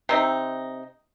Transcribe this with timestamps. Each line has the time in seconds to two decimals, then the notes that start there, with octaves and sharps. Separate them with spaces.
0.09 C3 C4 D#4